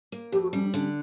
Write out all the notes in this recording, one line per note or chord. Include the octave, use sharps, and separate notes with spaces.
A#3
F2 G4
F#4
G3 C#4
D4
D3 C#4